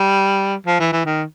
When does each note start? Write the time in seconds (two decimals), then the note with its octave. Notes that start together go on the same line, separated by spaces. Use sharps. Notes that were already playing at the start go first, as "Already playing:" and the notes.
Already playing: G3
0.67 F3
0.80 E3
0.93 E3
1.06 D#3